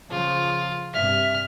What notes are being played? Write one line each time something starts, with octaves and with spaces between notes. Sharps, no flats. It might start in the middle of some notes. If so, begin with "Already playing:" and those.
C#3 F3 F4
G2 C3 E5 F6